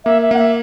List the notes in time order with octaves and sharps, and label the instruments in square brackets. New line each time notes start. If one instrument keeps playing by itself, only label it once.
[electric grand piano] A#3 [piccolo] E5
[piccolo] E5
[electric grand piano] A#3 [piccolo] F#5
[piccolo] E5